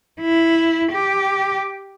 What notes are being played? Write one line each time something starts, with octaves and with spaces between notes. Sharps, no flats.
E4
G4